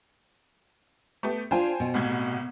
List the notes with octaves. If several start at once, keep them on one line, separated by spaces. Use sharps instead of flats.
A3 B3 G4
D4 F4 C5 G5 G#5
B2
C2 A2 G#6